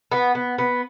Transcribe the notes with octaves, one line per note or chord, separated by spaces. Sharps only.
B3
B3
B3